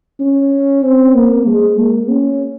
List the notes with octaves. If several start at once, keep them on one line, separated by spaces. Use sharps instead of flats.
C#4
C4
A#3
G#3
A#3
C#4